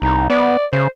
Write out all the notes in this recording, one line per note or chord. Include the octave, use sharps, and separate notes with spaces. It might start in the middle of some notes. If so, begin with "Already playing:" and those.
C2 D#4
B3 D5
C#3 C5